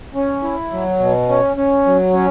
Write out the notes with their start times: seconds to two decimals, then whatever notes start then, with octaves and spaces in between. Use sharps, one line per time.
0.15 C#4
0.43 E4
0.71 F#3
0.99 B2
1.29 C#4
1.56 C#4
1.86 F#3
2.13 C#4